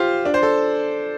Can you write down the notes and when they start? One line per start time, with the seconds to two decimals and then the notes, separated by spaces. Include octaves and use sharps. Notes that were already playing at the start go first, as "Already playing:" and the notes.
Already playing: F4 G4 C5
0.25 D4
0.34 C5
0.43 A4